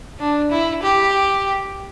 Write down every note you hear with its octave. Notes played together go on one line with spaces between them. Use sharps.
D4
E4
G4